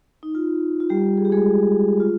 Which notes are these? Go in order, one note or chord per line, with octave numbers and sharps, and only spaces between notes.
D#4
F4
F4
G3 G4
G#4
G4
G#3 G#4
F4